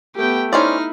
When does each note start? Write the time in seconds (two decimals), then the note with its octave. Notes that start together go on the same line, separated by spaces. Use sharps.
0.16 A3 B3 G4 G5
0.53 C#4 D#4 E4 C5 D5 F6